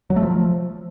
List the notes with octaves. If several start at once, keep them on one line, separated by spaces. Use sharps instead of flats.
F#3
A3
F3